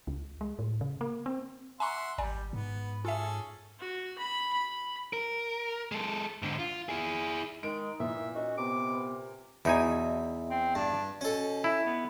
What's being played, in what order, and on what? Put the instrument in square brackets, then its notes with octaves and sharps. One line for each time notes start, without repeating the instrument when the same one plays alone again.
[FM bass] C#2
G#3
A2
C#3
A#3
C4
[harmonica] E5 F#5 C6 [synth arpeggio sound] G#5 A#5 C#6
[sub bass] G#1 [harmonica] G3 [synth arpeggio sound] D5 G#5 A#5
[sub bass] G#2 [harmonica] B3
[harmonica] C#4 G#4 A4 [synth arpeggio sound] F4 E5
[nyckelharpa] F#4
B5
B5
[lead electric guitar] A#4
G#3 A4
G#2 D3
F4
E4 G#4
[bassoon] D#3 [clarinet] G#3 [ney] D#4 [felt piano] D7
[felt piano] A#2 [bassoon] E3 [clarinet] E5
[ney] A#3
[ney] C#4 [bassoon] D#4 [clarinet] F#4
[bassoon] C3 [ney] B3 [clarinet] D6
[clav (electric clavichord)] E2 D#4 G#5 [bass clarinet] B2 [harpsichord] E5
[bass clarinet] C4
[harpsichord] G2 [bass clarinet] D4
[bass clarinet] B2 [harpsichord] C#4 A4
[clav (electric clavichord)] E4
[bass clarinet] B3